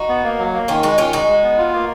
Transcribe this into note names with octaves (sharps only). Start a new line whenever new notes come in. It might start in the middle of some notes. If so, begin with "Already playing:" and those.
Already playing: D#4 F#4
B3
A#3
F#3
A#3
D#3 C#4 F4
G#3 D#4 F#4
D#3 C#4 F4
G#3 D#4 F#4
G#3
B3
F4
A#3